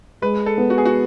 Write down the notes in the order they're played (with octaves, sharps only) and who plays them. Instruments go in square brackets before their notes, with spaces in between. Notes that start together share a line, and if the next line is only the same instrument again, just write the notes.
[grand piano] G#3 [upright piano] B4
[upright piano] A4
[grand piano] B3
[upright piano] F#4
G#4
F#4